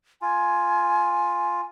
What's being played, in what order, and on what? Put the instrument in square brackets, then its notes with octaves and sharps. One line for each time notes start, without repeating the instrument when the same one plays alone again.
[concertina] F4 [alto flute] G#5